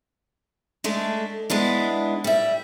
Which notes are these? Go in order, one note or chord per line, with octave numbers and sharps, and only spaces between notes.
G#3 A3 D4
G#3 B3 D4 E4
G3 E5